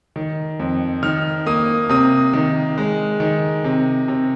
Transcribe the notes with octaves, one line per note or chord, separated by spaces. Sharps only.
D#3
F2
D#3 F6
A#3 D#6
C3 D#6
D#3
G#3
D#3
C3
C3